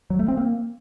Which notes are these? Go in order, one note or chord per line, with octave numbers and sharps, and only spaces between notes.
F#3
A3
C4
A#3